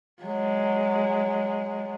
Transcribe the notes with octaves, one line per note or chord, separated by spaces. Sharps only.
F#3 G#3